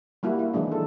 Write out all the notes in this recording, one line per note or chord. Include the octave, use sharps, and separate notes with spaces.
G3 A#3 E4 F#4
E4
D#3 E3 F#3 G#3 D4
A4